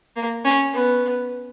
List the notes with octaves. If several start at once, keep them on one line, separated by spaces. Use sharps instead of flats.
A#3
C#4
B3